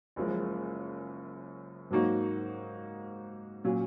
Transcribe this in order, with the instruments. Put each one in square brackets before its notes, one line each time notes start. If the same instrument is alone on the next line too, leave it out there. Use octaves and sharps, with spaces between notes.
[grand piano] F#1 F#2 F3 G#3
G#2 F#3 A#3 D#4 F#4
A#2 F#3 C#4